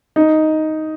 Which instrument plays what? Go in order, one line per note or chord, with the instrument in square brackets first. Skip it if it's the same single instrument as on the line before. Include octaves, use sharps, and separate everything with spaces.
[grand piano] D#4